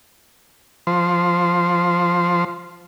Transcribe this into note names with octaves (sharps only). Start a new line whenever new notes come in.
F3 C5